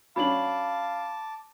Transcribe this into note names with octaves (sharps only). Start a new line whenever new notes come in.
F#3 C#4 D4 F5 A5 B5 D6 F#7